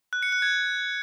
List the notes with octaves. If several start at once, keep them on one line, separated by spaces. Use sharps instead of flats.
F#6
C#7
F#6
G#6